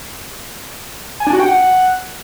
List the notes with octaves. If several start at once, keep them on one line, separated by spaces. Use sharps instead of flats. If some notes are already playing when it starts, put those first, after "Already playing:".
G#5
D4
F#4
G5
F#5